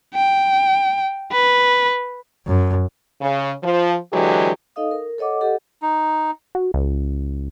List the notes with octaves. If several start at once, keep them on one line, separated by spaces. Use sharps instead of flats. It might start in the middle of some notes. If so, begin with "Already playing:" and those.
G5
B4
F#2
C#3
F3
D3 E3 F#3 G#3 G4
D#4 A4 D#5 F5 D#6
A#4
A4 C#5 D#5 F#5 D6
G4 A4 D#5 F#5
D#4
F#4
C#2